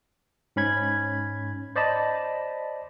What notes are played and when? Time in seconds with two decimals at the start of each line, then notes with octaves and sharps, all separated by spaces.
0.56 G#2 C#4 B5 G#6
1.76 C5 D5 D#5 A5 B5